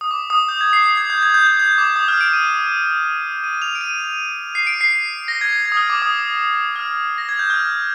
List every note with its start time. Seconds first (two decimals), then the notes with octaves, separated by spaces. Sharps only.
0.01 D#6
0.11 D6
0.30 D#6
0.48 G6
0.61 G#6
0.73 C7
0.86 C7
0.97 G#6
1.10 G6
1.23 G#6
1.34 G6
1.47 G6
1.59 G6
1.78 D6
1.96 D#6
2.08 F6
2.21 D7
2.33 D#7
3.44 D#7
3.62 F7
3.75 D7
3.81 D#7
4.55 C7
4.67 D7
4.81 C7
5.28 A#6
5.41 G#6
5.53 G#6
5.65 G#6
5.72 D#6
5.77 F6
5.90 D6
6.02 D#6
6.76 F6
7.18 A#6
7.29 G#6
7.39 G6
7.50 F6